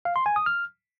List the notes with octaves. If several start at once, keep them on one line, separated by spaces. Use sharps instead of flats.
F5
C6
G#5
D#6
F6